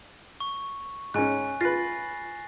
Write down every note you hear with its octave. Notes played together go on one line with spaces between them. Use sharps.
C#6
G#2 C#4 G#5 F#6
F4 B4 A6 A#6 C7